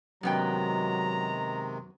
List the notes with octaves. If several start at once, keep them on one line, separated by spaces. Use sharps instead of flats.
F#2 C3 D#3 F#3 G#3 B3 G5 A#5